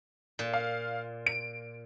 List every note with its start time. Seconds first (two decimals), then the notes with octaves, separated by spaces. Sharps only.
0.39 A#2
0.54 F5
1.26 D7